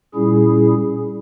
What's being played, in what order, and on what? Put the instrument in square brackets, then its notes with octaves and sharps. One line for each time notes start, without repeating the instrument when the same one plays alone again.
[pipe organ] A#2 G3 C#4 E4 G#4